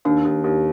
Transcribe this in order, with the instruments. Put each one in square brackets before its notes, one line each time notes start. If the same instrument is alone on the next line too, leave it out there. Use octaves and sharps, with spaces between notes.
[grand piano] D#2 [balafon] D4
[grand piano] D#2
D#2